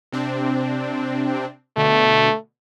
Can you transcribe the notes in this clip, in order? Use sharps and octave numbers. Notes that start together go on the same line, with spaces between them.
C3 C4 D4
B2 D3 A3